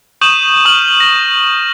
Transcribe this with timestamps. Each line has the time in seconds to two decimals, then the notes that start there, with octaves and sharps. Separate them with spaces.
0.21 C#6 D#6 G6 D#7 E7 F#7
0.65 C#6 D#6 F6 F#7
1.00 A#6